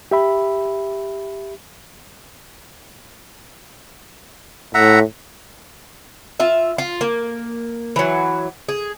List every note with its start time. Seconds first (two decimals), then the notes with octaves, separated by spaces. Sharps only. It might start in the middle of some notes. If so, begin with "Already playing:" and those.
0.11 G4 E5 B5
4.74 A2 E5 F#5 A#5
6.40 F4 E5
6.78 F4
7.01 A#3
7.96 E3 F#3
8.69 G#4